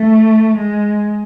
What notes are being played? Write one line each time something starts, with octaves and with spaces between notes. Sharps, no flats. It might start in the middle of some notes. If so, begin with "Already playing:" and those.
Already playing: A3
G#3